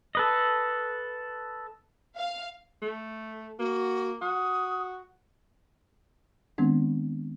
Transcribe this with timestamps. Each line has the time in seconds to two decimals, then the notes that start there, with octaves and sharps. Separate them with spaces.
0.15 A4 B4 D#5
2.16 F5
2.82 A3
3.59 A#3 F#4
4.21 F#4 D#6
6.58 D#3 G#3 B3 C4 D4